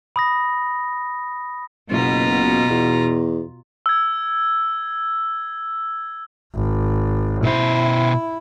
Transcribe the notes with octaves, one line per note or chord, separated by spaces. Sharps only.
B5 D#6 A#6
F#1 B2 F4 A#5
E2
E6 G#6
G#1
B2 E4 C5